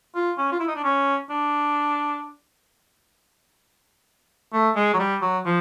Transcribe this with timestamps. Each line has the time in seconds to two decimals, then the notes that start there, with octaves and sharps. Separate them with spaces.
0.15 F4
0.38 C#4
0.51 F4
0.60 E4
0.67 D#4
0.76 D4
0.84 C#4
1.30 D4
4.53 A3
4.76 G#3
4.94 F#3
4.99 G3
5.22 F#3
5.45 F3